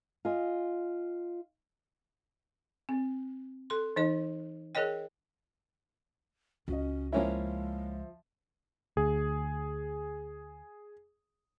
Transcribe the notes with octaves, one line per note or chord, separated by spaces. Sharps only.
F4 D#5 G#5
C4
A4 C6
E3 D#4 D#5
G#4 A#4 C#5 D#5 G5
C#2 C#4 F#4 D#5
F3 G#3 A#3 C#4 E4 E5
D2 G#4